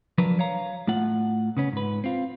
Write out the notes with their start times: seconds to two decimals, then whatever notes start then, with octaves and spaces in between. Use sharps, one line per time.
0.18 F3 F#3 D4 A#4 B4
0.39 C#5 F5 A#5
0.87 A2 A3 F4 F#5
1.57 C#3 B3 C#4
1.72 G#2 B4
2.04 C4 F4